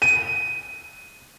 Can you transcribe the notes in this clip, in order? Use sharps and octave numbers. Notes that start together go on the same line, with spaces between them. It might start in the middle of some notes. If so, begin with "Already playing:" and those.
D#7